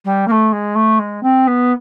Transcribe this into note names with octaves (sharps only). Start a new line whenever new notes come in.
G3
A#3
A3
G#3
A3
G#3
C4
B3